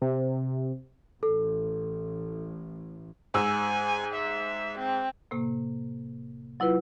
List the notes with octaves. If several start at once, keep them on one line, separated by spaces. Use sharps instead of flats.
C3
A1 A2 A4
G#2 G#5 E6
E5
C4
A2 C3 A#3
F#3 E4 F4 B4